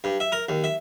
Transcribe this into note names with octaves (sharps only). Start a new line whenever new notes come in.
G2
E5
A#4
D#2
E5